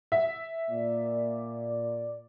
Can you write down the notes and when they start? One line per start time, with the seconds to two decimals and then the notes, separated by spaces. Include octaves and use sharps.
0.12 E5
0.69 A#2 D5